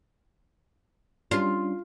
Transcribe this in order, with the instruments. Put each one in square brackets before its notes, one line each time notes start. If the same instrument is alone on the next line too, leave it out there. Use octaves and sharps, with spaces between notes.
[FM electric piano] G3 C#4 D4 [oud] F4